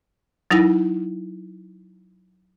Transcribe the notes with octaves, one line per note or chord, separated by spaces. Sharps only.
F#3 D#4 E4 A#6